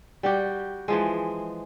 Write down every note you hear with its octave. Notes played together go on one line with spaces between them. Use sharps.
G3 F#4 G4
E3 F3 G#3